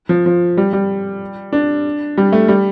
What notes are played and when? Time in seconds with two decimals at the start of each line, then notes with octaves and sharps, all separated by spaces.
0.09 F3
0.26 F3
0.57 G3
0.73 G3
1.53 D4
2.17 G3
2.33 A3
2.48 G3